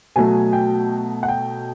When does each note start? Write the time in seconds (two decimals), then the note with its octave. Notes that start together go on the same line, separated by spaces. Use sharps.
0.16 B2 F#3 A3 G#5
0.53 G5
1.23 F#5
1.28 G5